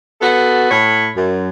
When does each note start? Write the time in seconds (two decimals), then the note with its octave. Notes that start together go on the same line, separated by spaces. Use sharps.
0.21 B3 F#4 A4
0.70 A2 C#5 B5
1.15 F#2